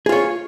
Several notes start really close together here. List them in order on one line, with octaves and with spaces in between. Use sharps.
G#4 F4 C#5